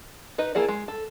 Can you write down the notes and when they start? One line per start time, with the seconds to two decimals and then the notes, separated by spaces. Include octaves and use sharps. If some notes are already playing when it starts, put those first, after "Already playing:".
0.38 D#4 B4 D#5
0.55 A#3 E4 G#4 A4 D5
0.68 G#3
0.88 A4